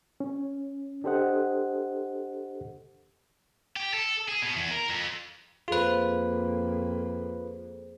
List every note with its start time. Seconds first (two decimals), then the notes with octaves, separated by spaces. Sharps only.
0.20 C#4
1.04 D4 G4 A4 C5 D#5 F#5
3.76 G4
3.93 A4
4.28 G#4
4.42 B2
4.56 E2
4.71 A#4
4.89 F2
5.68 F2 A#3 F4 G#4 A4 B4 C5